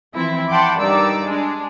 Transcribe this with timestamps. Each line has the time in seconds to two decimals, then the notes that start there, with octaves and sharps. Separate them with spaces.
0.14 E3 F3 C4 E4
0.49 F#5 G5 A5 B5 C6 D6
0.78 G2 D#3 D#4 D5 D6 E6
1.22 G#3 D4